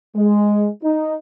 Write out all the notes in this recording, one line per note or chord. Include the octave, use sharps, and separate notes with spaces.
G#3
D#4